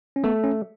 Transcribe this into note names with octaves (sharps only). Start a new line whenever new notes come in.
C#4
A3 B3
C#4